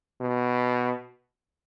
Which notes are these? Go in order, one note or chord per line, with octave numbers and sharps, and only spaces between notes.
B2